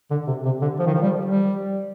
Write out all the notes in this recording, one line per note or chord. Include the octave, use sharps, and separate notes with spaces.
D3
C3
C3
D3
F3
D#3
F3
G3
G3